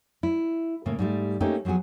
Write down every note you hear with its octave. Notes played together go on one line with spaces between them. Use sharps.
E4
A2 C#3 A#3
G#2 G3 A3
A3 A#3 C4 C#4 D#4 G4
F3 F#3 B3 F#4 G#4